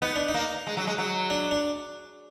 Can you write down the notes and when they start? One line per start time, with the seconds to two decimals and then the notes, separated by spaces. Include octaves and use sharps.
0.02 B3 D#4
0.16 D4
0.28 D#4
0.34 A#3
0.67 G#3
0.77 F#3
0.87 G#3
0.98 F#3
1.30 D4
1.51 D4